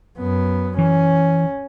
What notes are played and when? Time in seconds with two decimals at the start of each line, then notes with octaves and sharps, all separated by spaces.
0.18 F#2 B3
0.78 E3 C#4